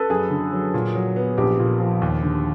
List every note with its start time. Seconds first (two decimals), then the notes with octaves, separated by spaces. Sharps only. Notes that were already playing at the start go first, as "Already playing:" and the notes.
Already playing: A4 B4
0.10 F#2 G#4
0.31 D3
0.52 F#3
0.74 A#2
0.95 F#3
1.16 B3
1.38 A#1 G4
1.59 A#2
1.80 F3
2.02 D#2
2.23 D3